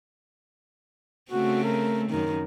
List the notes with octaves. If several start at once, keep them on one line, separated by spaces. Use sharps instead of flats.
C#3 A3 C4 F#4
A#4
F#2 D#3 A#4